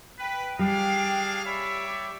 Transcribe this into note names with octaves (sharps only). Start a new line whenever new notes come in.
B4 G5
G3 D4 G#4 F5 G5
C#5 D5 E5 B5
G4